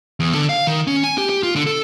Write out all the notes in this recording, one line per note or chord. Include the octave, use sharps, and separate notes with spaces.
E2
D3
F5
D#3
C#4
G#5
G4
G4
F4
D3
A4